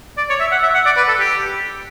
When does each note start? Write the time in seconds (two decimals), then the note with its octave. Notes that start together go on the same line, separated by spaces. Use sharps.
0.17 D5
0.30 C#5
0.41 E5
0.52 F#5
0.63 E5
0.74 F#5
0.86 D5
0.97 B4
1.08 A4
1.20 G4